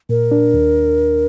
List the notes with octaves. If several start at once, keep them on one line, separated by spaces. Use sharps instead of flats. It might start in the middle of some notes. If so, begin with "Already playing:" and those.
A#2 A#4
D4
D#2